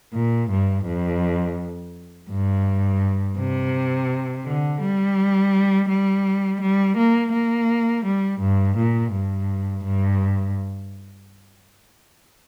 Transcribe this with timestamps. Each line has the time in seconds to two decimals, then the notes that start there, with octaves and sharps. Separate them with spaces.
0.14 A#2
0.50 G2
0.87 F2
2.30 G2
3.38 C3
4.46 D3
4.81 G3
5.89 G3
6.61 G3
6.97 A#3
7.33 A#3
8.05 G3
8.40 G2
8.77 A#2
9.13 G2
9.84 G2